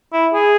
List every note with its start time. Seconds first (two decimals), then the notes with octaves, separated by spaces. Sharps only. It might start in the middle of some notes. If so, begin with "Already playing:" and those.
0.13 E4
0.34 G#4